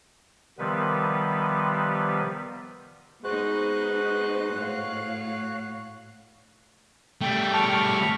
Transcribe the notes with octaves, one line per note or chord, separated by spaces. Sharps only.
C3 D#3 F3 G3 B3 B4
G#3 B3 D#4 F#4 B4 C5 F#6
A2 C#5 F5
G3 A3 G5
A5 C#6 F6